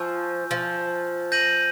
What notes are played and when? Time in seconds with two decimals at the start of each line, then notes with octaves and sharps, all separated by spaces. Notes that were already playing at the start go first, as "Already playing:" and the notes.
Already playing: F3 G#5 C#6 E6 G6
0.51 F3
1.32 G6 A#6 D#7 F#7